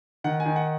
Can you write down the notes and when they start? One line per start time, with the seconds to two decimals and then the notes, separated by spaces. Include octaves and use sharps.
0.24 D#3 F#5
0.40 G#5
0.45 D#3
0.56 F#5